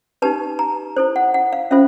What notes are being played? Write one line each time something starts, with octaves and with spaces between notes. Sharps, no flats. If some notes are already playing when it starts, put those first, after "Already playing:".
D#4 G4 B4 A5
A#5
E4 A4 C5
F#5
F#5
F5
C#4 F4 A4 C5 E5